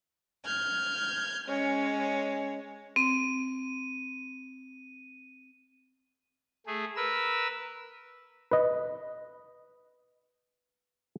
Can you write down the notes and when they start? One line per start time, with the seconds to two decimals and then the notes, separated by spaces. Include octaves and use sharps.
0.45 F6 G6 G#6
1.47 G#3 C#4 C#5
2.96 C4 D#7
6.66 A3 G#4
6.96 A#4 B4 E6
8.51 B4 D#5